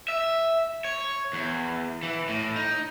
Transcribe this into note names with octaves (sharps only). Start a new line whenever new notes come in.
E5
C#5
E2
E3
A2
D#4